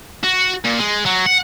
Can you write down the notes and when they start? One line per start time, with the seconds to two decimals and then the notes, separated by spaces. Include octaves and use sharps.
0.24 F#4
0.65 A#2
0.80 G#3
1.06 F#3
1.26 F#5